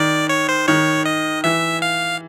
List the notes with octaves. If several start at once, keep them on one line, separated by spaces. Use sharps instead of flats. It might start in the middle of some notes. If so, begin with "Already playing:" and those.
Already playing: D#3 D5
C#5
C5
D#3 C#5
D#5
E3 E5
F5